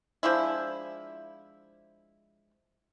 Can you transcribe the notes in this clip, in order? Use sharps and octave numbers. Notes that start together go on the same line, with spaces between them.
F3 G#3 D4 E4